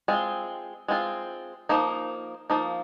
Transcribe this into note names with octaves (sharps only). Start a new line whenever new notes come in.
G#3 C4 F4
G#3 C4 F4
F3 A#3 D#4
F3 A#3 D#4